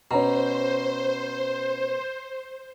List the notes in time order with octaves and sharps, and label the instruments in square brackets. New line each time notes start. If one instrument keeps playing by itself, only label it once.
[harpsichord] B2 [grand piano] C#4 A#5 [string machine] C5